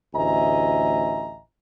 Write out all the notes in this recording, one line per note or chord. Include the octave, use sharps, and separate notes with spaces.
A1 D2 D#5 E5 G#5 A#5